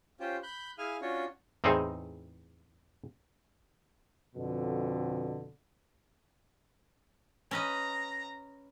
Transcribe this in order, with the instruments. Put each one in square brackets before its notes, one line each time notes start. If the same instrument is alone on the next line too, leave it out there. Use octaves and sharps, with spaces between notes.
[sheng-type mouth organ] C#4 F4 G4 C5
B5 F#6 G6
E4 G#4 F5 G#5 F6
C#4 D4 F4 F#4 C#5
[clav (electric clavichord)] E2 A2 C4 D#4 G#4 C5
[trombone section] F2 B2 D3
[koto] C#4 B4 D#5 [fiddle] A#5